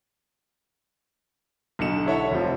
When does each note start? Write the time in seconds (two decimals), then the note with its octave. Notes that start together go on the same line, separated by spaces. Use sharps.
1.79 B1 D3 D#4 C#7 E7
2.06 E4 A4 C#5 E5 F#5
2.31 F1 F3